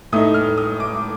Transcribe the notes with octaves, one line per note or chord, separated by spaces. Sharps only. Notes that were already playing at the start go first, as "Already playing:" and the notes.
A2 A3 D#4 D#6
F6
D#6
D6